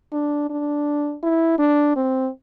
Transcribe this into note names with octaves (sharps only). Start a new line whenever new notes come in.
D4
D4
E4
D4
C4